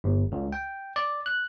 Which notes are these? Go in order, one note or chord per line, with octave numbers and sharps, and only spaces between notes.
G1
C#2
G5
D5
F#6